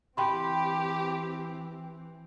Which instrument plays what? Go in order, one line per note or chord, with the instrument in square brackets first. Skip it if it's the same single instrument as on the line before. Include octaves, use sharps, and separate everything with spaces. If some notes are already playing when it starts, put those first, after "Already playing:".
[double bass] E3 C4 [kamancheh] G4 [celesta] G5 B5 C6